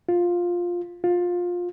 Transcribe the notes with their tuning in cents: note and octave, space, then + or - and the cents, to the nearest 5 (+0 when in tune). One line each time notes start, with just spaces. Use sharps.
F4 +10
F4 +20